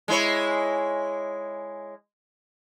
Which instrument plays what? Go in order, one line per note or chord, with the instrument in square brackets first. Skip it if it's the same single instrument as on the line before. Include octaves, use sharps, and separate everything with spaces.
[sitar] G#3 E4 C#5